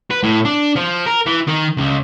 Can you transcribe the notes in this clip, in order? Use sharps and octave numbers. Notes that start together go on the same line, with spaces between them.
B4
A2
D4
F3
A#4
E3
D#3
C#2